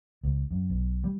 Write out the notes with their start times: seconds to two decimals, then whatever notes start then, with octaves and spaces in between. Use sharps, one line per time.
0.24 C#2
0.51 F#2
0.70 B1
1.04 G3